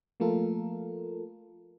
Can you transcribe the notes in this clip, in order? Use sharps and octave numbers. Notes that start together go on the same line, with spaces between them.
F3 A3 A#3 F4 A4 A#4